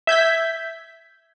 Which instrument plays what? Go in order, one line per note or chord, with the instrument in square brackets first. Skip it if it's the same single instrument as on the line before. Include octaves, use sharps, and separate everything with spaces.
[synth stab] E5 G6 G#6 B6